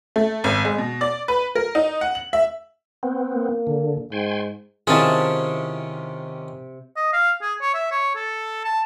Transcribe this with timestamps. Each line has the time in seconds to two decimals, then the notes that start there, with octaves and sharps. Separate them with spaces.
0.16 A3
0.44 G#1
0.65 G#3
0.78 B2
1.01 D5
1.28 B4
1.55 A#4
1.75 D#4
2.01 F#5
2.15 F#7
2.33 E5
3.03 B3 C4
3.35 A#3
3.67 D3
4.12 G#2 G5 G#5 C6
4.87 C3 D#3 C#4 E4 F4 G#4 A5
6.97 D#5
7.13 F5
7.42 G#4
7.61 C#5
7.75 E5
7.92 C#5
8.16 A4
8.65 A5